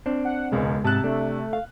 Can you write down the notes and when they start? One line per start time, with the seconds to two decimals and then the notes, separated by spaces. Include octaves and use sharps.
0.06 C4 D4
0.25 F#5
0.52 E1 C#2 G#3
0.84 G#2 C3 A5 F#6
1.04 A3 D4
1.53 F5